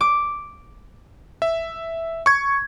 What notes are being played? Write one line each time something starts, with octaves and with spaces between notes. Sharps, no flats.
D6
E5
C#6 G#6